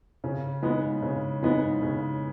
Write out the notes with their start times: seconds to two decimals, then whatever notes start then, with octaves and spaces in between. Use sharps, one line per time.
0.24 C#3
0.63 G#3 B3 D#4
1.02 C#3
1.43 G#3 B3 D#4
1.82 C#3